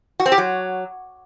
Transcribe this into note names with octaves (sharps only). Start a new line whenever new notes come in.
F#4
C4
G4
F#3